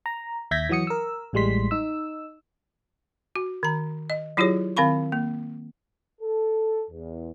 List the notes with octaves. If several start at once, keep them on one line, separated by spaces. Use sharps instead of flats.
A#5
D#2 E5 G6 G#6 A#6 B6
E3 F#3 F#4 D#6 C#7
A#4 E6
A1 A2 G3 G#3 C6 B6
D#4 E6
F#4
D#3 A#5
D#5
F#3 E4 F4 G4 G#4 C#5
D#3 C4 F5 B5 C#6
A#3
A4
E2